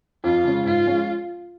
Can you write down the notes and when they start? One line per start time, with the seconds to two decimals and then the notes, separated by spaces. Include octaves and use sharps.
0.24 F2 F4
0.44 C#3 G#3 C#4
0.65 G#2 F4
0.85 F3 G#3 C#4